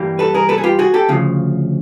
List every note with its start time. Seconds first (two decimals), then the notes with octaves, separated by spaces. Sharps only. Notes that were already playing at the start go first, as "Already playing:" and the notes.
Already playing: G2 E3 G3 A#3
0.19 A4 B4
0.34 G#4 A#4
0.49 A4 B4
0.58 G#4
0.64 F4 G4
0.79 F#4 G#4
0.94 G4 A4
1.09 D2 C#3 F3